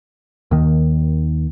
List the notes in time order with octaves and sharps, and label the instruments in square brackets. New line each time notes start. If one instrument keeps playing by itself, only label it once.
[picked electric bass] D#2 D#3